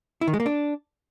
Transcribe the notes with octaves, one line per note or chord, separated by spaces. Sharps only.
E4
D#3
G#3
A#3
D4